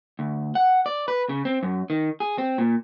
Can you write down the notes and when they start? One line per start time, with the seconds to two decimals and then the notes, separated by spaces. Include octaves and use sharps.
0.19 D2
0.55 F#5
0.86 D5
1.08 B4
1.29 C#3
1.45 C4
1.63 F#2
1.90 D#3
2.20 G#4
2.38 C4
2.58 A#2